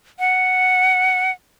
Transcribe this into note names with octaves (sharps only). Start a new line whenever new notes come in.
F#5